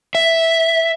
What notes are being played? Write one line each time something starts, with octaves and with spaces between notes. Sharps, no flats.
E5